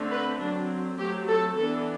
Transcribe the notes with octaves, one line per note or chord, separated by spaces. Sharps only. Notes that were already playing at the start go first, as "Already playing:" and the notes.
Already playing: D3 A3 C4
B4
D3 F#3 C4 D4
F#3 A3 C4 G4
A4
E3 B3 D4 A4